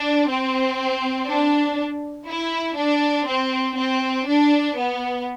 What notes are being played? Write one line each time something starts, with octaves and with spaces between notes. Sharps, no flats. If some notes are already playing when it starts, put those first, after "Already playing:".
Already playing: D4
C4
D4
E4
D4
C4
C4
D4
B3